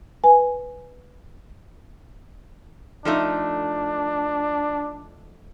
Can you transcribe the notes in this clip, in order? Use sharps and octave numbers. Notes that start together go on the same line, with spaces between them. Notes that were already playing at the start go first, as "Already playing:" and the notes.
B4 G#5
F3 A3 D4 D#4